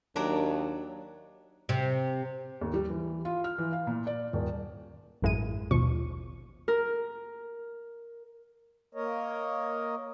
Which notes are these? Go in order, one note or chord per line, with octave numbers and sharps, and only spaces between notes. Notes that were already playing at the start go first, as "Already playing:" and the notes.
D#2 F#3 D4 A#4
C3
D#2
G3
E3
F4
F6
E3
F5
A#2
D5
D#1
A1 F#2 G#3 E4 G#4 D#7
A1 D#2 B2 F3 C#6
A#4
A#3 A#4 C#5 D#5